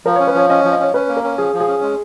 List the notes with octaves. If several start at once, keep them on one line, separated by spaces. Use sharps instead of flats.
F3 A#4
C#5
C#4
B4
F3 C#5
C#4 D#5
C#5
F3
D#5
C#4 C#5
C#4 B4
A#3
A#4
C#4
F3 G#4
F3
G#4
C#4
G#3